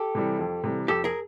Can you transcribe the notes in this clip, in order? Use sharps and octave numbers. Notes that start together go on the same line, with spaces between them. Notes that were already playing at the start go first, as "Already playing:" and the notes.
Already playing: G4 A4
C3 E3 G3
F2
C3 E3 G3
F2 G4 A4
G#4 A#4